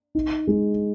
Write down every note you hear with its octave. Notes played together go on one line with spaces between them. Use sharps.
D#4
G#3